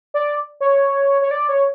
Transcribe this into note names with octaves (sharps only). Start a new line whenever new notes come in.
D5
C#5
C#5
D5
C#5